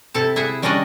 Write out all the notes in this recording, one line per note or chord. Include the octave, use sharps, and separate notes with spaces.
C3 E4 A4 A5
E4 G#4 E5 F#5
G3 C#4 D4 F#4 D5 D#5